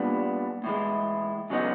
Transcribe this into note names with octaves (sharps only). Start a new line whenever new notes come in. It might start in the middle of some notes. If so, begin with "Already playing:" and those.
Already playing: A#2 G3 B3 D4
A2 E3 G#3
C#3 F#3 B3 D#4